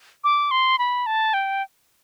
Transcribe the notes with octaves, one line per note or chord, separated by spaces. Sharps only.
D6
C6
B5
A5
G5